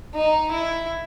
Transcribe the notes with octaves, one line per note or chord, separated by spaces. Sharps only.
D#4
E4